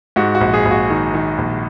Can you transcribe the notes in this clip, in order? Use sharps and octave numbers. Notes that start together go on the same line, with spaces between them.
G#2 F#4
F#4
A#1
G#4
A#1
F#4
D#3
D#3
A#1